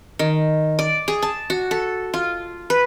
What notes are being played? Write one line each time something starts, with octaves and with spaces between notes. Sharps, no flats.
D#3
D5
G#4
A5
F#4
A4
F4
B4